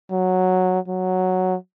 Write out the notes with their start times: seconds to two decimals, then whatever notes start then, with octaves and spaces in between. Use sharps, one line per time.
0.11 F#3
0.88 F#3